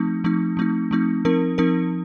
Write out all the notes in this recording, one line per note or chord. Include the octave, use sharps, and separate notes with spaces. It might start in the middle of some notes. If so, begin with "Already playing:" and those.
Already playing: F3 A3 C4 D#4
F3 A3 C4 D#4
F3 A3 C4 D#4
F3 A3 C4 D#4
F3 C4 D#4 A#4
F3 C4 D#4 A#4